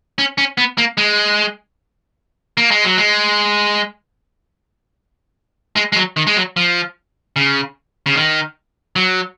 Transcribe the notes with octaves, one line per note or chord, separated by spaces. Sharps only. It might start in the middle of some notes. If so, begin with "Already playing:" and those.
C#4
C#4
B3
A#3
G#3
A#3
G#3
F#3
G#3
G#3
G#3
F#3
D#3
G#3
F#3
F3
C#3
C#3
D#3
F#3